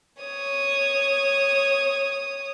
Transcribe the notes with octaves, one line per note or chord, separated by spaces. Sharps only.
C#5 D#6